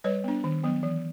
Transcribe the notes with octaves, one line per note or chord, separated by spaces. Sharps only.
G3 B4 C#5
B3 D4
D#3
F#3 B3
E3